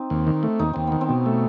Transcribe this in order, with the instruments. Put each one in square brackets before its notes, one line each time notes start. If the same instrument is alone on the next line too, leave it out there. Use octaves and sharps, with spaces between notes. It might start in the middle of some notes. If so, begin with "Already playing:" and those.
Already playing: [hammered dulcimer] C4 D#4
[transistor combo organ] D#2
D#3
A3
[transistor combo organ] D#2 [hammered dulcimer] D#4
[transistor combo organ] D#2 [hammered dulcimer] C4
[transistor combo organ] D#3 [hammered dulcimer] B3
[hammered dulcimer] C4
[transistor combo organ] B2
A3